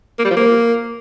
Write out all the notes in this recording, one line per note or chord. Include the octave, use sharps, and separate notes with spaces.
A#3
G3
F3
A#3